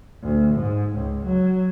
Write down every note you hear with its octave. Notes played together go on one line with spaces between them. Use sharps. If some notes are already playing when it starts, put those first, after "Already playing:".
D2
G#2
C#2
F#3